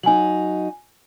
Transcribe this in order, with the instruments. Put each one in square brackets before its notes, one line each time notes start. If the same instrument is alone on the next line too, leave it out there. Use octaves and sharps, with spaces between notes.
[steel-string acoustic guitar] F#3 D#4 [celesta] G#5 F#7